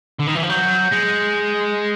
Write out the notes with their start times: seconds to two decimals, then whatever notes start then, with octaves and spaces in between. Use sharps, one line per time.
0.20 D3
0.27 D#3
0.35 E3
0.43 F3
0.49 F#3 G6
0.91 G#3 A#6 C#7 F#7